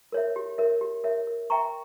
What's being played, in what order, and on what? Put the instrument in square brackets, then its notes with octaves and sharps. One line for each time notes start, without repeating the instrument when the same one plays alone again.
[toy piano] A#4 C#5 E5
G4
A#4 C#5 E5
G4
A#4 C#5 E5
A#4
E5 G5 A#5 C#6